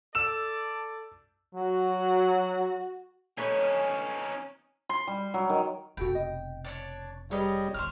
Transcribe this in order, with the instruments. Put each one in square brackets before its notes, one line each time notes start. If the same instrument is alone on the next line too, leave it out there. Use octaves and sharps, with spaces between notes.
[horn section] A4 D5 [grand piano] E6 E7
[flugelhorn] F#3 [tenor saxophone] F#4
[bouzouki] A3 B4 C#5 [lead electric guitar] C#4 D#4 [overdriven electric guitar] G#5
[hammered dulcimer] C6
G3
F#3
D#3
[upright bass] F1 B2 [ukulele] F#4 A4 B5 [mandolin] G5
[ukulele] D#5
[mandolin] D4 C#5 D5
[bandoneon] G3 [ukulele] G#4 A#4 B4 [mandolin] C#5 D#5
[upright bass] G1 C#2 [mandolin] C5 C#6 F6